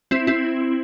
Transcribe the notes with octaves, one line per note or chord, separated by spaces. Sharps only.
C4 E4
C4 E4